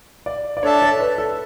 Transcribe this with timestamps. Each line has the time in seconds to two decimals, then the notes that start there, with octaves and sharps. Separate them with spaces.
0.26 D5
0.57 D5
0.63 D4 A4 C#5 E5 A5
0.82 C#5
1.00 B4
1.18 A4